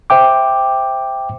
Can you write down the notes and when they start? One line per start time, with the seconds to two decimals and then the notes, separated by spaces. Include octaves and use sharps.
0.10 C5 E5 G5 D6